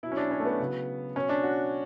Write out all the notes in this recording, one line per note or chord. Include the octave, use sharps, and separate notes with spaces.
B2 F#3 E4
C#4
D4
C#4
A3
B3
C#3 F#3
B2 F#3 C#4
D4
F#4